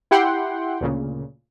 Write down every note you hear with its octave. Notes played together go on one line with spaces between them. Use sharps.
E4 G4 F#5 G5 C6
D2 A#2 C#3